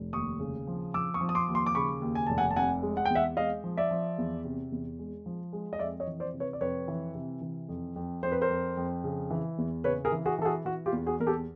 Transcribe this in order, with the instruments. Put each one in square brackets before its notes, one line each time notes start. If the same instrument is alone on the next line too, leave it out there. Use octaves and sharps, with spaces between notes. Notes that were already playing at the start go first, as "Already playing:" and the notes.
Already playing: [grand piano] F1
D#2 C#6 D#6
C#3
F3
F3 D6 E6
C#6 D#6
F3
D#6
C6 D6
D#2
C6 D6
D6
C#3 B5 C#6
D#2
G#5
F1 A5
F#5 G#5
A5
C3 F#5 G#5
G#3
F#5
G5
E2
E5 F#5
G#3 D#5 F5
F3
D5 E5
F3
E2
C3
E2
G#3
F3
G#3
D#5
F2 D5 E5
C#5 D#5
E3
C5 D5
C3
B4 C#5
D5
F2 B4 C#5
E3
C3
E3
F2
F2
F2 C5
B4
A#4 C5
F2
F2
C#3
E3
E2
C#3 B4 C#5
G#4 A#4
E3
F#4 G#4
E3 A4
F#4 G#4
E3 F#4
F4 G4
E2
F#4 G#4
E2 A#4
G4 A4